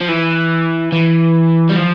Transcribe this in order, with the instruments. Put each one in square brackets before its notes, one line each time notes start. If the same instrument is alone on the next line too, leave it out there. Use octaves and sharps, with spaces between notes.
[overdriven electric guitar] F3
E3
E3
G3
F3